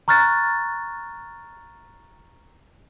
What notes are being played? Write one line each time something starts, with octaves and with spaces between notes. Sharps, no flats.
A#5 C#6 F6 F#6 A6